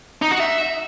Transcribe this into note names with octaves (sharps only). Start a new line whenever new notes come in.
D#4
F#4
E5